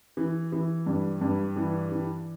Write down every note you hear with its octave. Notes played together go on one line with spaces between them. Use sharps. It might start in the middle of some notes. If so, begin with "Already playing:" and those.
E3
E3
G2
G2
E3
E3